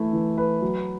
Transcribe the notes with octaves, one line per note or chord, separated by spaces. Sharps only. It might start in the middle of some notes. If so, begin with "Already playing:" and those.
Already playing: E3 A3 E4
E3
B4
F#3